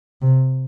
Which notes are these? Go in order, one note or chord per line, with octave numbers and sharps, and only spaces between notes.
C3